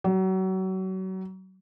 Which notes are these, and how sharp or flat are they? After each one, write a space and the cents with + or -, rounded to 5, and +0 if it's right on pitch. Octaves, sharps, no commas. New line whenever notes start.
F#3 +30